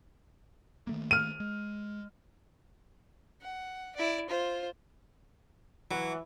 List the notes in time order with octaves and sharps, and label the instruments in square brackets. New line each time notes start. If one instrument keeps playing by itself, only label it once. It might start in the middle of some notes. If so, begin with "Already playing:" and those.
[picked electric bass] D#3 A3 A#3
[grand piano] F6 D#7
[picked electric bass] G#3
[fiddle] F#5
E4 D5
F4 C5
[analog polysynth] E3 [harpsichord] F#3